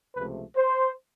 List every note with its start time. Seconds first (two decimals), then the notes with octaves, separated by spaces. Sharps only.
0.15 C#2 C3 F3 A3 B4
0.56 C5